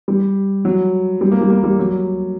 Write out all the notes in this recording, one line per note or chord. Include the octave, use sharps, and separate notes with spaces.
G3
F#3
G3
A#3
G3
A#3
G3
F#3